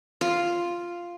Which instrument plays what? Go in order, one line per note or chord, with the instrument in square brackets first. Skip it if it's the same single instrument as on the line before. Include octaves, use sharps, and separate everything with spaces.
[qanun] F4